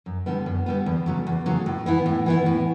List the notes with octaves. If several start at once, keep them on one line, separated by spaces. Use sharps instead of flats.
F#2
D3 G3 B3
F#2
D3 G3 B3
E2
C#3 F#3 A3
E2
C#3 F#3 A3
A2
E3 B3 E4
A2
E3 B3 E4
A2